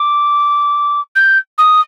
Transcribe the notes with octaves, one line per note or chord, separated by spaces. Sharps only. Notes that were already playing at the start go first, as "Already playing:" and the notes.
Already playing: D6
G6
D#6